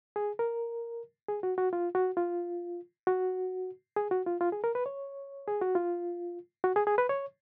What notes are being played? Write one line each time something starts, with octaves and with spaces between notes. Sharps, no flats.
G#4
A#4
G#4
F#4
F#4
F4
F#4
F4
F#4
G#4
F#4
F4
F4
G#4
A#4
B4
C#5
G#4
F#4
F4
F#4
G#4
G#4
B4
C#5